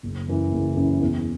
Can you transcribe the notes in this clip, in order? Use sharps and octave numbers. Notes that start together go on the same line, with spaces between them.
F#1
F#2 E3
F#1
F#2 E3
E2